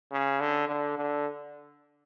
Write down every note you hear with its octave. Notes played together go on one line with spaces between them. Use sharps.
C#3
D3
D3
D3